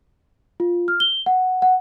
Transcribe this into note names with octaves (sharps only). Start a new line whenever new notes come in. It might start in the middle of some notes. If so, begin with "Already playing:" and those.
F4
F6
G7
F#5
F#5